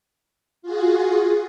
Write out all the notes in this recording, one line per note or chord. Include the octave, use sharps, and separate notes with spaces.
F4 F#4 G#4